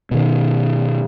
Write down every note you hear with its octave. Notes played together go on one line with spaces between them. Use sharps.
B2 D#3